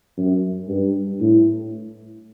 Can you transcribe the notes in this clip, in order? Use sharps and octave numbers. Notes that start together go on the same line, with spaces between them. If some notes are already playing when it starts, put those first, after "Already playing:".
F#2
G2
A2